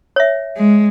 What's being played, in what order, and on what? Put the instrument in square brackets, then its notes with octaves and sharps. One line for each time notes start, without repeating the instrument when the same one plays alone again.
[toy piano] C#5 E5
[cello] G#3